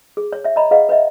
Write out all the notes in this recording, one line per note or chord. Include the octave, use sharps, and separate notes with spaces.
G#4
C#5
C#5 E5
C#5 D#5 A#5 B5
G#4 B4 D#5 F5 F#5
B4 C#5 D#5 E5